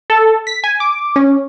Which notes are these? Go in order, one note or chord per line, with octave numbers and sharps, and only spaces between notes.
A4
B6
G#5
D6
C#4